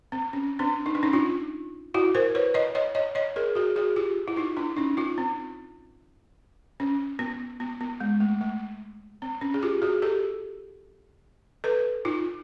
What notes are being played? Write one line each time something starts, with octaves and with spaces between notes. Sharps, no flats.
C4
C#4
C4 D4
D#4
D4
C#4 D#4
D#4 F4
E4 F#4
A#4 C5
B4 C#5
C#5 D#5
C#5 D#5
C#5 D#5
C#5 D#5
G#4 A#4
F#4 G#4
F#4 G#4
F4 G4
E4
D#4 F4
D4 E4
C#4 D#4
D#4 F4
C4
C#4
B3
B3
B3
G#3
A3
A3
C4
C#4
G#4
F4 G4
F#4 G#4
G4 A4
A4 B4
D#4 F4